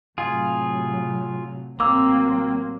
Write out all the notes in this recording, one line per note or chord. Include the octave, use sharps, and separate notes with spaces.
A2 C3 F#3 F4 G#4
A1 F#3 A#3 C4 D6 E6